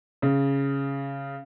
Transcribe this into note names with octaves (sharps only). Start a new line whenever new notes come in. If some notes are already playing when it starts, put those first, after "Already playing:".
C#3